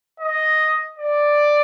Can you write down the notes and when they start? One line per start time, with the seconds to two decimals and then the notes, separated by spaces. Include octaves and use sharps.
0.20 D#5
0.99 D5